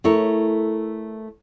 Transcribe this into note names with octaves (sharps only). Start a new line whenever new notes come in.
A3 E4 A#4 C#5